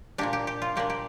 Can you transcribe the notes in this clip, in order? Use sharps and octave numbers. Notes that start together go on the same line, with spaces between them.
A#2 A#3 D4 G4
G4
G4
F4
A#2 A#3 D4 G4
G4